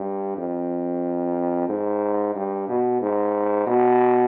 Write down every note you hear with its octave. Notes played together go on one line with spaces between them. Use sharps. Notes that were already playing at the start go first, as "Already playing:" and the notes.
Already playing: G2
F2
G#2
G2
B2
G#2
B2